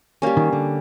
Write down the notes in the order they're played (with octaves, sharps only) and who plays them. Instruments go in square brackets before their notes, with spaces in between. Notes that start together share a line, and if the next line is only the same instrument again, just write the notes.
[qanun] G3 A#3 C#4
[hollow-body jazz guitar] D#3
D3